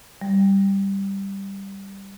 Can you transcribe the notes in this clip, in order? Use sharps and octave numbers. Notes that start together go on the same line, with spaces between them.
G3